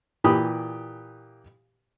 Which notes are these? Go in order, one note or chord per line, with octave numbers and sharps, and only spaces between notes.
A#2 E3 G4 B5 D#6